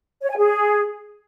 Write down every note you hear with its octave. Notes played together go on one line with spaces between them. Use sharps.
C#5
G#5
G#4